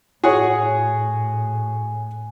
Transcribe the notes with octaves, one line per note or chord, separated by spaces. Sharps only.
A2 F#4 G#4 C#5 F#5 G#5